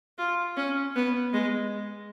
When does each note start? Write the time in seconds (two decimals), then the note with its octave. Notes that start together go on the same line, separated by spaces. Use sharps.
0.18 F4
0.57 C#4
0.96 B3
1.33 G#3